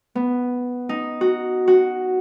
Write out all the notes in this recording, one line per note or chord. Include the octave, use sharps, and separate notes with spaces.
B3
D#4
F#4
F#4